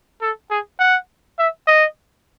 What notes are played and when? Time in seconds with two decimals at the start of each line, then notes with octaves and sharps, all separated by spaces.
0.22 A4
0.50 G#4
0.79 F#5
1.39 E5
1.67 D#5